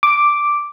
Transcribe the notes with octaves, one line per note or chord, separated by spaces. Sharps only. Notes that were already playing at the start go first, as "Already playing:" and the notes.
D6